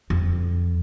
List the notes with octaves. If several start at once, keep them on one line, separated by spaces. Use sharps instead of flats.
F2